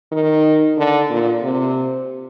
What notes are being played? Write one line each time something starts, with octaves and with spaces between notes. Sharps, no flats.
D#3
D3
A#2
C3